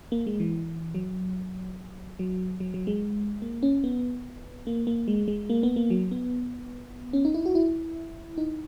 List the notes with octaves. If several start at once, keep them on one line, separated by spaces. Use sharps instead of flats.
A#3
G#3
E3
F#3
F#3
F#3
F#3
G#3
A#3
C#4
B3
A#3
A#3
G#3
G#3
A#3
B3
A#3
F#3
B3
C#4
D#4
E4
F#4
E4
D#4